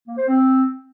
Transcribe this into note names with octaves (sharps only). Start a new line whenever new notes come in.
A#3
C5
C4